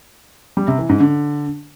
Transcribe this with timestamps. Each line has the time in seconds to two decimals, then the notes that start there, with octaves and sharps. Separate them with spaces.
0.57 G3
0.68 C3
0.79 E3
0.89 G#2
1.00 D3